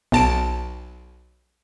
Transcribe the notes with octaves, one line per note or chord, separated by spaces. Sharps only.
B1 A5 D7